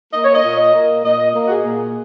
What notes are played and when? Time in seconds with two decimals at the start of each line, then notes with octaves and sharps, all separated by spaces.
0.13 A#3 D#5
0.24 C#5
0.35 D#5
0.45 A#2
0.74 A#3
1.05 A#2 D#5
1.36 A#3
1.46 F#4
1.51 G#4
1.65 A#2